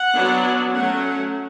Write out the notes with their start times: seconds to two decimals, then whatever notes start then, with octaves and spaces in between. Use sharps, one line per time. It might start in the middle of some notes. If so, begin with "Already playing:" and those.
Already playing: F#5
0.15 F#3 B3 D4
0.73 F#3 A3 C#4 F#5